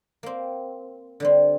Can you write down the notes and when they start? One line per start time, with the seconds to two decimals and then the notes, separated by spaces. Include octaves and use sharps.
0.23 A#3 C4
1.20 D3 G3 C4